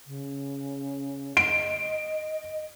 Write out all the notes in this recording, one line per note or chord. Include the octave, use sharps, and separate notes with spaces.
C#3
D#5 D7